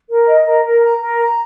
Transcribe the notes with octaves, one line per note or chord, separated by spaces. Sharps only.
A#4
D#5
A#4
A#4
A#5
A#4
A#5